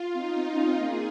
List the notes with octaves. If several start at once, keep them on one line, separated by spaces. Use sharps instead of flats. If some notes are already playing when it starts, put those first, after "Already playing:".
Already playing: F4
C4 D#4
C4
F4
C#4
C4
A#3 G#4